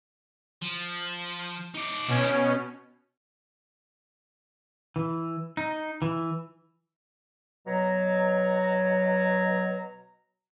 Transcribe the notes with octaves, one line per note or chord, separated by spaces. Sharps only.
F3
D#4 D5
B2 C#4
E3
D#4
E3
B2 F#3 A#5